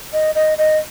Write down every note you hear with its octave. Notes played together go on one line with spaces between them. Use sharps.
D#5
D#5
D#5